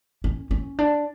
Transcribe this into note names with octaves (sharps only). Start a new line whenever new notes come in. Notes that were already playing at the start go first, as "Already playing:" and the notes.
C#4
C#4
D4